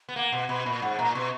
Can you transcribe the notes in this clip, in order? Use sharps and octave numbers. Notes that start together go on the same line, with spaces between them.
B3
A#3 F#5
B2 F#5
B2 B5
A#2 B5
G#2 F#5
A#2 A#5
B2 C#6